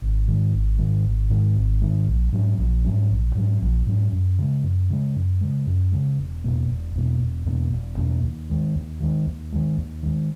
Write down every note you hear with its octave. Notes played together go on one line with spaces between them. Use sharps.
G#1
G#2 D#3 G#3
G#1
G#2 D#3 G#3
G#1
G#2 D#3 G#3
G#1
G#2 D#3 G#3
A#1
G#2 F#3 C#4
A#1
G#2 F#3 C#4
A#1
G#2 F#3 C#4
A#1
G#2 F#3 C#4
F#2
C#3 G#3
F#2
C#3 G#3
F#2
C#3 G#3
F#2
C#3 G#3
E1
E2 B2 A#3
E1
E2 B2 A#3
E1
E2 B2 A#3
E1
E2 B2 A#3
D#2
D#3 G#3
D#2
D#3 G#3
D#2
D#3 G#3
D#2
D#3 G#3